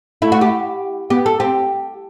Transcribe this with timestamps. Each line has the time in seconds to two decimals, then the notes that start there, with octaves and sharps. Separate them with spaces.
0.22 A3 E4
0.32 F#4
0.41 G4
1.10 B3 G4
1.26 A4
1.40 C4 G4